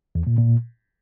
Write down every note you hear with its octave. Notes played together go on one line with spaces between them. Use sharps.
E2
A#2
A#2